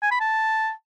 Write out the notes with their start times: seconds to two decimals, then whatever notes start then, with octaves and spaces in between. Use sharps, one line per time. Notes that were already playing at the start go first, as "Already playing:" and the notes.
0.02 G#5
0.11 B5
0.20 A5